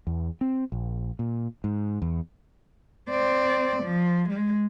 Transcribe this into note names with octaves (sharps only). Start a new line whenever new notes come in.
E2
C4
A#1
A#2
G#2
E2
C4 D5
F3
G#3